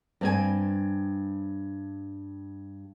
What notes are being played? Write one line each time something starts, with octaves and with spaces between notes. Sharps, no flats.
G2 C4 G#5